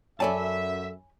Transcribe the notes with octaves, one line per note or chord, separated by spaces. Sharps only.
F#2 A4 C#5 D5 E5 G#5 A5 B5